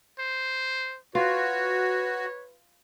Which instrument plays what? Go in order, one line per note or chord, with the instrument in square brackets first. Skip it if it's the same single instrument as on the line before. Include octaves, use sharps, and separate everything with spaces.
[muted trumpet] C5
[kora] F4 [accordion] F#4 [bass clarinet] B4 [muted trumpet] C#5